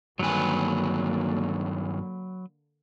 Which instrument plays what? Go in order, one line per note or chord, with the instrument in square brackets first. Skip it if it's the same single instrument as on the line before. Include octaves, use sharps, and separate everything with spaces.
[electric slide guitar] G2 D#3 G#5 [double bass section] D3 A#3 [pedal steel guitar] F#3 B4